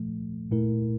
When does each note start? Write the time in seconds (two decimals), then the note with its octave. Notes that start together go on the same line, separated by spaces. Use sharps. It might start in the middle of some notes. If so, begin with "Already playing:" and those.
Already playing: A#2 F3 A3
0.51 A#2 A3 E4 A#4